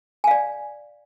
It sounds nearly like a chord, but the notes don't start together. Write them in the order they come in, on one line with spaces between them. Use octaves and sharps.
G#5 F5 D5